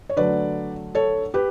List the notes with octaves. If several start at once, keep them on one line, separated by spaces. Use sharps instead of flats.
C#5
D3 F#3 A3 B4 D5
A4 C#5
G4 B4